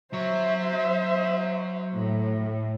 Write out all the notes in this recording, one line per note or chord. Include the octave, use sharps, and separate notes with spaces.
F#3 C5 C#5 E5
A2